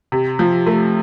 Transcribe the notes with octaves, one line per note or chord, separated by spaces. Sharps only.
C3
F3
A3